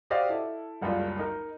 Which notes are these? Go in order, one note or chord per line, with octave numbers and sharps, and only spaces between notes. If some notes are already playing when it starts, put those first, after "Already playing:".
F#4 G4 C5 D5 D#5 F5
E4 A4
F#1 C#2 F#2 G3 F4
D#4 A#4